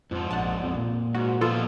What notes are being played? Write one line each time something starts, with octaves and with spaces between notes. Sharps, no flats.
F2 G#2 F3
A#1 F#5 A5
F2
A#2
G#2 F#4
F3 B3 D#4 F4 A4 F5